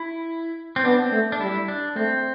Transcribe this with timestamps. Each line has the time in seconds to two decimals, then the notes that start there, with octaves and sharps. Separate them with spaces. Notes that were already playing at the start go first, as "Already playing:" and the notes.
Already playing: E4
0.76 C4
0.84 B3 D4
1.02 C4
1.12 A3
1.32 D4
1.41 G3 E4
1.68 D4
1.96 A3 C4